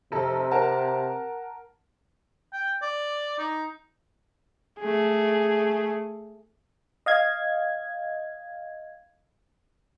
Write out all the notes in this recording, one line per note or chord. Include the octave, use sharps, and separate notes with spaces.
F1 C3 A4
A#4 F#5 A5
G5
D5
D#4
A3 G#4
D#5 F5 G#6